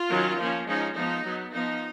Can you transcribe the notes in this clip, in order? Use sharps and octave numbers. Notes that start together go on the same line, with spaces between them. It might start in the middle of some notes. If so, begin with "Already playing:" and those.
Already playing: F4
D#3 F#3 C#4
F3 A#3 C#4
F3 G#3 C#4 D#4
F3 G#3 B3 D#4
F#3 B3
F3 B3 D#4